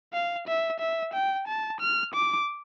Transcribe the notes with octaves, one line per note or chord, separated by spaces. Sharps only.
F5
E5
E5
G5
A5
F6
D6